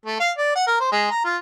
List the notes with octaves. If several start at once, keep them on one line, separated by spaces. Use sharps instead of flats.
A3
F5
D5
F#5
A#4
C5
G#3
A#5
F4